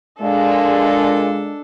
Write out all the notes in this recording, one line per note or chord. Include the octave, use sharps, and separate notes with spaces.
A#2 G#3 D4 A4